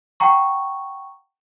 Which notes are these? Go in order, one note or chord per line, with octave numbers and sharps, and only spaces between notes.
F#5 G5 A#5 C#6